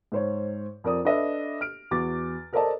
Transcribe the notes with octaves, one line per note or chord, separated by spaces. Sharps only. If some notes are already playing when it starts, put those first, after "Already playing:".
G#2 C5 C#5
F2 A#4 D5 D#6
D4 A4 B4 D#5 E5
F6 D7
E2 F#4 D6 A6
A4 A#4 C5 D5 D#5 A5